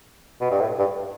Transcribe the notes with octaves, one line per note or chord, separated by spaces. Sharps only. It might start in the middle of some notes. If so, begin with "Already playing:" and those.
B2
G2
A2
G2